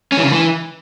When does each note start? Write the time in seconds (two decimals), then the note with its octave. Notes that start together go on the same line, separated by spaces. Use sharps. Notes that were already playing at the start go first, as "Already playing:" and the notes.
0.12 C#4
0.17 E3
0.22 C#3
0.28 D3
0.33 E3